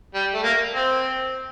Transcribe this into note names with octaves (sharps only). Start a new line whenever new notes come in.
G3
A3
A#3
C4